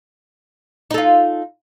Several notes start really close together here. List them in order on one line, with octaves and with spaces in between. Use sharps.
D#4 A4 F4